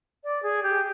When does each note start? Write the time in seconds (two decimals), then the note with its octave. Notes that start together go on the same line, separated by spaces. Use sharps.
0.24 D5
0.43 G#4
0.63 G4